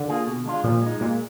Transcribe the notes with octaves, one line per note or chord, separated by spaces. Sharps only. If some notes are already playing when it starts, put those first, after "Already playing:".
Already playing: D3
A#3 F4 G#4
B2
G#3 D4 F4
A#2 F3
G#3 D#4
A#2 G#3